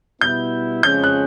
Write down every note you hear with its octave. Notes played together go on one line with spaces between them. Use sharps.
B2 G3 B3 E4 G6
F2 C#3 F3 G#3 C#4 G6
F#6